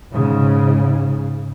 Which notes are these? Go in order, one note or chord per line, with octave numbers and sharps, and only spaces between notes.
G#2 C#3